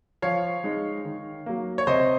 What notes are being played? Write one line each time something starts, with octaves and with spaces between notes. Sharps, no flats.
F3 C#5 F5
G#3 D#4
D#3
F#3 A#3
C#5
C3 C5 D#5